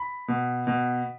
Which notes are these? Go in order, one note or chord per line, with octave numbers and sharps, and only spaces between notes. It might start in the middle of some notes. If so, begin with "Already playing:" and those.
Already playing: B5
B2
B2